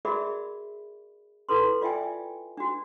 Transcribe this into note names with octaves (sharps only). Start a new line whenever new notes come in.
F#4 G#4 A#4 D5 E5 B5
E4 A4 B4 C6
F4 D5 E5 G5 G#5
D4 F#4